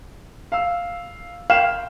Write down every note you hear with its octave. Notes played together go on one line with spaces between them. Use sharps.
F5 E6
F5 G5 E7